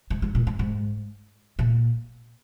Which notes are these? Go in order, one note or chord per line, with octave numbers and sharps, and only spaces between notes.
G#2
G#2
A#2
G#2
G#2
A#2